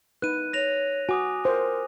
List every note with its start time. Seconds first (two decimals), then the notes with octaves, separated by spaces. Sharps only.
0.22 D#4 B4 F#6 D#7
0.53 C#5 A#6 F7
1.09 F#4 G#5 D6 D#6
1.45 A#4 C5